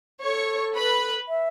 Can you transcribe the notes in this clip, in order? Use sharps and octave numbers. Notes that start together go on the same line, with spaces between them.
A4 C#5 C#6
B4 B5
E5